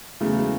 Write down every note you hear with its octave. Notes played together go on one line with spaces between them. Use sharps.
E2 C#3 F#3 A3
G#3